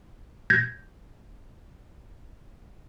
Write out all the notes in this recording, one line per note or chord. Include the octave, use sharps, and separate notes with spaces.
G6 G#6 A#6